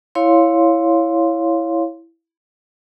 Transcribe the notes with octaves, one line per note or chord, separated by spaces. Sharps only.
E4 C#5 F5 C6